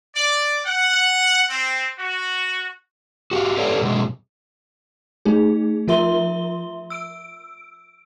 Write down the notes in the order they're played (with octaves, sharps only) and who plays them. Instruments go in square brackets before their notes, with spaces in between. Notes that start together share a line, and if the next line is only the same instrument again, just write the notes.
[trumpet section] D5
F#5
C4
F#4
[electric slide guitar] F#4 G4 F5
G4 A4 B4 C#5 D5 F5
F#2 B2 G#3
[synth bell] A3 D#4 G#4
F3 F4 A#4 E5 C6 G7
E6 D7